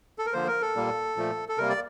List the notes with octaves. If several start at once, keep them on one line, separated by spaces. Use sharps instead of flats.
A4
A#4
D3 F3 A#3 C5
A#4
A4
A#2 G3 A#3
A#2 F3 A3
A4
C3 G3 A#3 A#4
D5